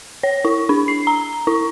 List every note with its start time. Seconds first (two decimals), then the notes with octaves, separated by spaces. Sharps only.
0.23 C#5
0.45 E4
0.69 D4
0.88 C7
1.07 A#5
1.47 E4